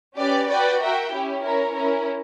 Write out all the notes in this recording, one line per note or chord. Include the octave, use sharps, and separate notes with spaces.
C#4 G4 B4 D5
F#4 B4 D5 G5
F#4 A#4 E5 G5
C#4 E4 G4
C#4 E4 A#4 C#5
C#4 E4 A#4